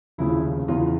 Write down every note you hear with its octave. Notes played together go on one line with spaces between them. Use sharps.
F1 D#2 C#3 F3 E4
E2 C#3 E3 F4